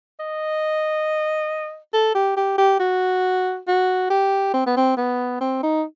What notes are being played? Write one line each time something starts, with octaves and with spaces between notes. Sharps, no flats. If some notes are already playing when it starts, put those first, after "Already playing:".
D#5
A4
G4
G4
G4
F#4
F#4
G4
C4
B3
C4
B3
C4
D#4